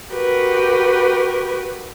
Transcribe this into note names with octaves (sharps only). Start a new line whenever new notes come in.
F#4 G4 A#4 B4